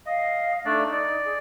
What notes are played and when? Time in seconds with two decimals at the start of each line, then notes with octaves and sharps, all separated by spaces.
0.06 D#5 F5
0.65 A3 D4 D#4 D5
0.92 D5
1.25 G#4